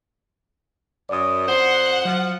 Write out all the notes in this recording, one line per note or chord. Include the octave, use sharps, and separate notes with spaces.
F#2 D5 D#6
F2 C5 F#5
F3 F#3